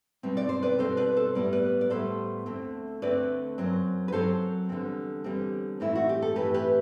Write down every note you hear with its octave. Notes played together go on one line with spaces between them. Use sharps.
B2 G3 C4
D5
C5
B4 D5
B2 G3 C4 A4 C5
B4 D5
A4 C5
A2 G3 B3 D5
B4 D5
D5
A2 G3 B3 A4 C5
D2 D3 A3 C4
D2 D3 A3 C4 B4 D5
F#2 F#3 C4
B4
F#2 F#3 C4 A4 C5
E2 D3 G3 C4
E2 D3 G3 C4
A2 E3 A3 C4 E4
F#4
G4
A4
A2 E3 A3 C4 G4 B4
G4 B4